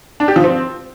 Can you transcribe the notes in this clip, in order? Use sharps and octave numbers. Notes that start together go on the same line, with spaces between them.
D4
G4
F3
C4